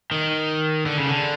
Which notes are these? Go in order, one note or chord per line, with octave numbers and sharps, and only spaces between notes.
D#3
D3
C#3
D3